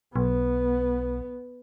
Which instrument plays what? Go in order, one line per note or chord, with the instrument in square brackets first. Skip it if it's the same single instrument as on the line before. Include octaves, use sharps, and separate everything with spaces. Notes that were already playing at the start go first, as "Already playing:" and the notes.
[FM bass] B1 [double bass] B3